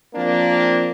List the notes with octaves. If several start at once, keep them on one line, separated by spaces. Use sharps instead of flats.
F3 A#3 C4 D4